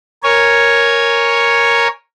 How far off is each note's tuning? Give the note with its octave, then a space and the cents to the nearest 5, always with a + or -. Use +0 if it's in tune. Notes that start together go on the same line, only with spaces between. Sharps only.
A#4 +0 C#5 +0 G#5 +0